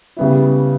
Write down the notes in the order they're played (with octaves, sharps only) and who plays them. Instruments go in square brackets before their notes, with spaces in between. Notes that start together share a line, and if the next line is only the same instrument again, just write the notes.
[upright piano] C#3 G3 B3 E4